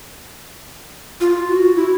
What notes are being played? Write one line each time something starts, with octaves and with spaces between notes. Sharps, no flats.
F4
F#4
E4